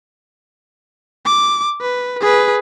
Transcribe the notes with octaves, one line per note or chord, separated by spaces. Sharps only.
D6
B4
G#4 B4